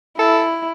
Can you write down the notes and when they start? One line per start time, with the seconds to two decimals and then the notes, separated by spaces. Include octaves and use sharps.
0.19 E4 A4